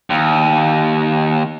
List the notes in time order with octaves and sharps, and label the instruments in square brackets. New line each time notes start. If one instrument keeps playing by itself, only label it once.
[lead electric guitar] D#2